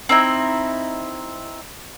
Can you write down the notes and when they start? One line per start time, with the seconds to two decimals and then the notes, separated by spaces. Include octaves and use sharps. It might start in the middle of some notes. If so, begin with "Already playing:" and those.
0.09 C4 D#4 E4